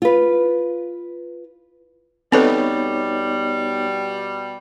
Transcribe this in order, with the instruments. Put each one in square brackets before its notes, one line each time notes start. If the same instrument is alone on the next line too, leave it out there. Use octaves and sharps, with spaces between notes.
[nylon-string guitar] F4 B4
[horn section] B2 G3 [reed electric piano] B3 D#4 C#5 [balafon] C4 A4 B4